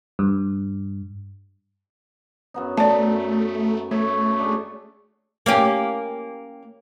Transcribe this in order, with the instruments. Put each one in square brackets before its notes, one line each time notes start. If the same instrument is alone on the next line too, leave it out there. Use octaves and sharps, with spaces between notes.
[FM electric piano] G2
[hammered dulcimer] F#2 B3 D#4
[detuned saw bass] A3 [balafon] D5 A5
[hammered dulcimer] F#2
[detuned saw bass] A3 [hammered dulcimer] C#5 E5 C#6
[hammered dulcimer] D4 G#4
[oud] A#3 C#4 G4